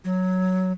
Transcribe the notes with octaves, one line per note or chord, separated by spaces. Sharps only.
F#3